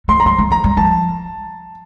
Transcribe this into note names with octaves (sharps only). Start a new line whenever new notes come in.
A3 C6
A#5
G3 C6
A3
F3 A#5
G3
F3 A5